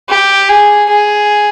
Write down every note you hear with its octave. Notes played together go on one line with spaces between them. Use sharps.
G4
G#4
G#4